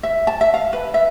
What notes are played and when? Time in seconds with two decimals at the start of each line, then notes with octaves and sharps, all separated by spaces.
0.03 E5
0.27 A5
0.41 E5
0.54 F5
0.73 B4
0.94 E5